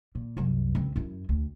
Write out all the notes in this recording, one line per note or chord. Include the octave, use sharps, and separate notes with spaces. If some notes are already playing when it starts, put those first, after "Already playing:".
A#2
C2 F#2
C#2 C4
F#2 E4
D2